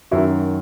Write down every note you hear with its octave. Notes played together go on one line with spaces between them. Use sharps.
F#2 D#3 E4 F#4